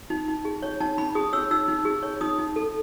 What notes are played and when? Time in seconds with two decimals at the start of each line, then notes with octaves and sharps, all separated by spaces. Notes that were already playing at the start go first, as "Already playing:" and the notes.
0.10 D#4
0.28 D#4
0.45 G#4
0.62 C#5
0.80 D#4 A5
0.97 D#4 B5
1.15 G#4 D#6
1.33 C#5 E6
1.51 D#4 E6
1.68 D#4
1.85 G#4
2.03 C#5
2.21 D#4 D#6
2.38 D#4
2.56 A4